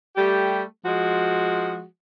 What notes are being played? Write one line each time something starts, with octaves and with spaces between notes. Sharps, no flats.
G3 A3 G4
F3 G#3 F#4